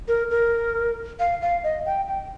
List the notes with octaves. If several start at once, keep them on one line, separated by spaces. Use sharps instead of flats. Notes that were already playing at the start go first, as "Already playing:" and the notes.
A#4
A#4
F5
F5
D#5
G5
G5